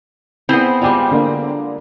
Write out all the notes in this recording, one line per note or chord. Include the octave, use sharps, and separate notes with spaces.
B3 C4 E4 G#4 C5
G3 G#3 F4 D5 G5 D6
D3 A#3 D4